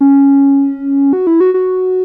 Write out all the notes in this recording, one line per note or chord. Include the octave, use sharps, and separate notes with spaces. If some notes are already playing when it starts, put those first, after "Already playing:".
C#4
F#4
E4
F#4
F#4